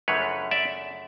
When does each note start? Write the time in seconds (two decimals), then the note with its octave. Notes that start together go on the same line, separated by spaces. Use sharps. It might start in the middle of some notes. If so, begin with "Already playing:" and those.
0.08 F#2 C#3 F3 A3 D4 B4 C#5
0.51 D5 E5